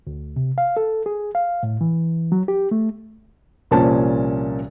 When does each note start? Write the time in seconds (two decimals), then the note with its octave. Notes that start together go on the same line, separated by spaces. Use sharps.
0.07 D2
0.36 C3
0.58 F5
0.77 A4
1.06 G#4
1.35 F5
1.63 A2
1.81 E3
2.32 F#3
2.48 G4
2.71 A3
3.71 C2 A#2 F3 A#3 C#4 A5